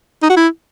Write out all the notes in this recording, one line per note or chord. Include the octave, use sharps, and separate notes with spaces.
D#4
F#4
E4